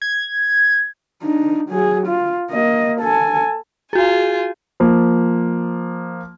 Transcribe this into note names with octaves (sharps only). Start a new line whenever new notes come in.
G#6
D4 D#4
F#3 G#4
F4
A#3 D#5
A4 G#5
F4 F#4 G#4 G#5
F3 A#3